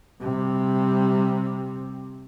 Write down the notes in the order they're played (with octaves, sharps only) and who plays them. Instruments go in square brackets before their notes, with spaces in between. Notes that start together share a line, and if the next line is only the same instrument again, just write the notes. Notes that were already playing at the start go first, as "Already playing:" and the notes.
[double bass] C3 G3